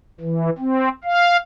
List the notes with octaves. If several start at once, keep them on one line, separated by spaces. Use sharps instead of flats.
E3
C4
F5